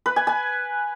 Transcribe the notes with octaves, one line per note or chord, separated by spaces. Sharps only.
B4
G#5
G#5